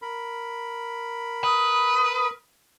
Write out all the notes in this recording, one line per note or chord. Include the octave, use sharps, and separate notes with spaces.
A#4 B5
B4 D#6